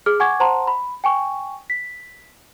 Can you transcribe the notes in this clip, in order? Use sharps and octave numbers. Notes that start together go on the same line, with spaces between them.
G#4 F6
F#5 G#5 C#6 D6 G#6
C5 F#5 A5 A#5 C6
B5
G5 G#5 C#6
B6